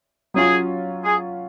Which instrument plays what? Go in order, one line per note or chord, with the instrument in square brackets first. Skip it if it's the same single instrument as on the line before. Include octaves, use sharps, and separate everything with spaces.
[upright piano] F#3 C#4 F4 [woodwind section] G#4
[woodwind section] G#4